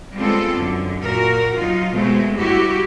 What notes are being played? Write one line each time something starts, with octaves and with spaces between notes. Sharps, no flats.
G3 G#3 B3 C4 F4 A4
F#2 D3
A#2 F#4 A#4
F3 F#3 D#4 F4
B2 G#3 A3 C4
G2 E4 F#4 G4